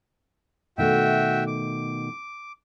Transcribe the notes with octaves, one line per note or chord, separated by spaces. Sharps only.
B2 D#3 A3 F#4 E5 G5
D6